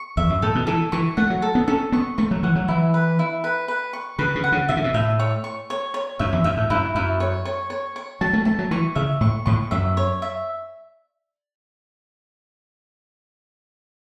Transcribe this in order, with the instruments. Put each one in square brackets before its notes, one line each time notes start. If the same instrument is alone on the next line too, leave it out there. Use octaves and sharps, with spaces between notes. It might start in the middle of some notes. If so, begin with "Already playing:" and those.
Already playing: [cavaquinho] C#6
[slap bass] E2 [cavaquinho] E5
[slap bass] F#2
[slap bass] A2 [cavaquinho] A4
[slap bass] B2
[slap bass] E3 [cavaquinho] A4
[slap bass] E3 [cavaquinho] C#6
[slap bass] A3 [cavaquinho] F#5
[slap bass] F#3
[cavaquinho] A4
[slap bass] B3
[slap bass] C#4 [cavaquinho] A4
[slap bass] B3 [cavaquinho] C#6
[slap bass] A3 [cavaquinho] C#6
[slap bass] F#3
[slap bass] E3 [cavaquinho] F#5
[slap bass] F#3
[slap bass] E3 [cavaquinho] E4
[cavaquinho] B4
E4
B4
B4
C#6
[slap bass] C#3 [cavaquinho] B4
[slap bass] C#3
[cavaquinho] F#5
[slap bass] C#3
[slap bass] B2 [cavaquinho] E5
[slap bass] C#3
B2
[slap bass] A2 [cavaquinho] E5
[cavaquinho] C#5
C#6
C#5
C#5
[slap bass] F#2 [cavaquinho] E5
[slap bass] E2
[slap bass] F#2 [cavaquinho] E5
[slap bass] A2
[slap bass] F#2 [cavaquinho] E4
[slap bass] F#2 [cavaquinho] E4
[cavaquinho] C#5
C#5
C#5
C#5
[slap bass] F#3 [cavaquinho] A5
[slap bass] A3
[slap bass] A3 [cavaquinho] A5
[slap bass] F#3
[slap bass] E3 [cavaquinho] C#6
[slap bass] C#3 [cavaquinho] E5
[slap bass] A2 [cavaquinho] C#6
[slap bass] A2 [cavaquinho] C#6
[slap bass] F#2 [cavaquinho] E5
[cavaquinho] C#5
E5